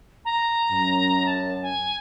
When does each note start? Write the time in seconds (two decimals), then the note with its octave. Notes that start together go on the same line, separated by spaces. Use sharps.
0.25 A#5
0.71 F#2
1.26 A5
1.62 G#5